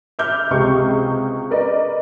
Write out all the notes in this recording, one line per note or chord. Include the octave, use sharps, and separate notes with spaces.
E5 D6 F6 G6
C#2 C3 G#4 C#6
A#4 B4 D5 D#5